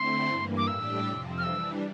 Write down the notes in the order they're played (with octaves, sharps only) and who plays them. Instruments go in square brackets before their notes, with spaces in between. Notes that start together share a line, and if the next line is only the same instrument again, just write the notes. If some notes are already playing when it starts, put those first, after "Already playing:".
Already playing: [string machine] D3 A3 C4 E4 [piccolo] C6
[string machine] G2 E3 A#3
[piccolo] D6
[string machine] A2 G3 D4 G4 [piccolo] E6
[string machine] F2 C3 F3 C4
[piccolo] F6
[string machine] E3 G3 D4 [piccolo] E6